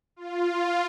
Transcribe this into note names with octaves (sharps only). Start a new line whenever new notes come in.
F4